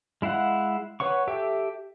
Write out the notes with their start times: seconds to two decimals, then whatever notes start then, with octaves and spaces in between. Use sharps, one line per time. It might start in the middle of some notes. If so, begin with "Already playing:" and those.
0.22 G#3 E4 F5 F#5
1.00 B4 C#5 F#5 C#6
1.27 G4 A4 E5 G5